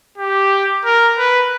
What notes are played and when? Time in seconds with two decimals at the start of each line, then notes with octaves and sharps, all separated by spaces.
0.18 G4
0.85 A#4
1.18 B4